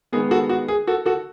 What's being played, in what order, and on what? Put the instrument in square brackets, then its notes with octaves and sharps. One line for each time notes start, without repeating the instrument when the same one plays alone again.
[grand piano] D#3 G#3 B3 G#4
F#4 A4
F#4
G#4
F#4 A4
F#4 A4